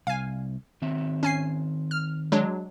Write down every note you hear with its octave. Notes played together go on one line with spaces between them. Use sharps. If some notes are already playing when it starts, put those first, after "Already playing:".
C2 F5 G#5
D#3 C4 E5
C#4 G#5 C7
F6
F#3 G#3 D4